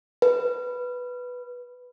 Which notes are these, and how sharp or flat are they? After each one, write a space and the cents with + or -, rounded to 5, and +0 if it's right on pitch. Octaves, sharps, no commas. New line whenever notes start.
B4 +0